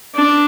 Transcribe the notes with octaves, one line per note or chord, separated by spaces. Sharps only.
D4